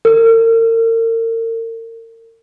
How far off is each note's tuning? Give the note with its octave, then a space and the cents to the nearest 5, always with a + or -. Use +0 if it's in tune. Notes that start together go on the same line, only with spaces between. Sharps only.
A#4 -40